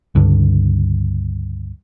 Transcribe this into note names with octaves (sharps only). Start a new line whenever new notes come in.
C#2 G2 D3